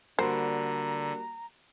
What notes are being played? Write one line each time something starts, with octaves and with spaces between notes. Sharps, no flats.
D3 G3 A#3 F#4 C5 A#5